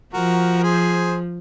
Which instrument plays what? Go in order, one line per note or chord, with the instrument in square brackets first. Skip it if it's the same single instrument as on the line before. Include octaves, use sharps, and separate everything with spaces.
[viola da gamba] F3 [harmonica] F#4 A#4
[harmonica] A#4
G#4 C5